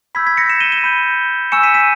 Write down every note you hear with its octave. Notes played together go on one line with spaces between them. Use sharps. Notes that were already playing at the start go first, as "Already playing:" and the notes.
B5 E6 G6 G#6 B6
G#6 B6
A#6 C#7
C#7 E7
D#7 G7
D#7 G7
B5 G6
G#5 C#6 E6 G6 C#7 E7
B6 D#7
B6 D#7